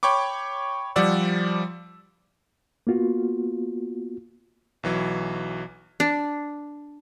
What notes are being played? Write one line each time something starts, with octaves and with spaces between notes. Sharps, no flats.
C#5 G5 B5 C#6 D6
F3 G3 D5 F#5 E6
A#3 B3 F4 F#4
B1 E3 F#3
D4